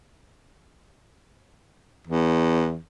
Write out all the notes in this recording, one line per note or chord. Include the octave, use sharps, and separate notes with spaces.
E2